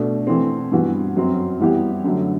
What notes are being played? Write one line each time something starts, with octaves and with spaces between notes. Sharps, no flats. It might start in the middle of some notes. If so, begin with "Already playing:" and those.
Already playing: B2 A3 D4
E3 A3 C4
G2 E3 B3 F#4
F#2 F#3 C4
E3 G3 B3 E4 G4
F#2 D3 F#3 A3